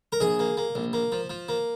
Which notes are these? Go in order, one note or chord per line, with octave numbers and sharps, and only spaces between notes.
A#4
A#1 G#4
A#3
A#3
A#1
A#3
F3
F3
A#3